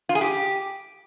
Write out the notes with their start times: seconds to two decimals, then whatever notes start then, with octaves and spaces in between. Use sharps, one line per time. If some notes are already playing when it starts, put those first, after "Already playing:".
0.09 F4
0.15 G#4
0.21 G4